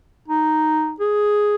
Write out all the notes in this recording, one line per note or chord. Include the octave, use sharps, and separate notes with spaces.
D#4
G#4